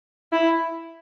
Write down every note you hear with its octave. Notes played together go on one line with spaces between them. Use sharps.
E4